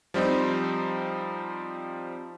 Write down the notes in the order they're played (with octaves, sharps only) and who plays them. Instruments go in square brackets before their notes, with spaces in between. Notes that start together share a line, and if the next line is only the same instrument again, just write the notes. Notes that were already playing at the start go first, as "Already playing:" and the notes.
[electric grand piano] F3 G3 C4 D#4